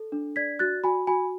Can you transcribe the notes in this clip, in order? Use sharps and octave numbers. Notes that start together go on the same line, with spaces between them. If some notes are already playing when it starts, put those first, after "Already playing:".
Already playing: A4
D4
D5 G#6 B6
F#4 F#6 A6
F#4 G#5 B5
F#4 G#5 B5